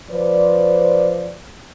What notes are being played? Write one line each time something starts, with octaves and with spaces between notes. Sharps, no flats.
F3 B4 C5 D5